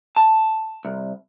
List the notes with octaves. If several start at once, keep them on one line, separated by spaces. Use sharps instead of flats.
A5
C2